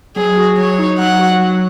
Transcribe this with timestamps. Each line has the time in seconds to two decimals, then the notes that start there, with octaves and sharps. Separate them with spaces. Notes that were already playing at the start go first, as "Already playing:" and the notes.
0.16 F#3 G#4
0.37 F#4
0.57 F#3 C#5
0.79 D#4
0.99 F#3 F#5
1.19 F#4
1.39 F#3